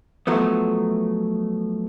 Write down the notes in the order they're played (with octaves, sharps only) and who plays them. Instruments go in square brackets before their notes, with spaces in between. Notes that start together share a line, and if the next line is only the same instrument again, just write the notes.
[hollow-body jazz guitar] F3 F#3 A3 B3